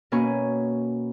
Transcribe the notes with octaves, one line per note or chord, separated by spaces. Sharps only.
B2 A#3 C#4 G#5 B5 C#6